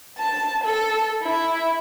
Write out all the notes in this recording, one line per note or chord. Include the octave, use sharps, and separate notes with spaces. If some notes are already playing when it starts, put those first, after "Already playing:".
A5
A4
E4